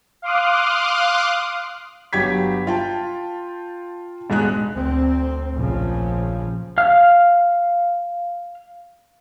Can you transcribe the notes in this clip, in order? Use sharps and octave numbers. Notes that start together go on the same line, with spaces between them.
F5 C6 D6 D#6 F6 F#6
G1 F#3 G4 G#6 B6
F4 G5 A5
E1 G#2 G#3 G#4 F#6
D2 C4
A#1 C#3 F3
F5 F6